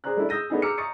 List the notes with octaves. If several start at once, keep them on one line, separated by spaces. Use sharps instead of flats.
G#4 C5 D5 A#5 F#6
G3 A3 D4 E4
D#6 E6 G6 A#6 D#7
A3 B3 D4 D#4 G#4
A#5 D6 E6 F6 C#7
A#5 C#6 D#6 A6 C#7